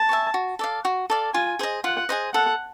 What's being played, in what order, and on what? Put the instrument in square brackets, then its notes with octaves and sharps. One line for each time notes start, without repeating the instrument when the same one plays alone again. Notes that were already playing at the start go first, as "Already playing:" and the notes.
Already playing: [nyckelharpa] A5
[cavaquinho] E5 G#5 C#6
F#4
A4 D5 F5
F#4
A4 D5 F5
[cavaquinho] F4 [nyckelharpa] G#5
[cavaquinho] G#4 C5 D#5
[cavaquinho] F4 [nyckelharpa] F#5
[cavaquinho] G#4 C5 D#5
[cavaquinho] A4 [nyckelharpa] F#5